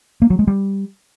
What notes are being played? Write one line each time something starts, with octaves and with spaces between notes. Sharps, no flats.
A#3
F#3
G#3
G3